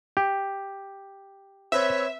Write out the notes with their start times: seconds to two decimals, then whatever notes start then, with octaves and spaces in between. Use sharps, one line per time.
0.17 G4
1.72 C4 B4 C#5 E5